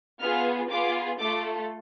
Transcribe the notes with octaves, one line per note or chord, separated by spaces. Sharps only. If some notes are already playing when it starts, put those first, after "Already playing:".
B3 F4 G#4 F6
B3 F4 G#4 D6
A3 F4 A4 D6